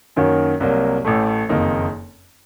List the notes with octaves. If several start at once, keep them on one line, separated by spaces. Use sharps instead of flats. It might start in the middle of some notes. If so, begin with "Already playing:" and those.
F#2 D#3 A#3 C#4 F#4
C2 C3 F#3 A#3
A1 A2 A3
F#1 F2 D#3 A#3 D#4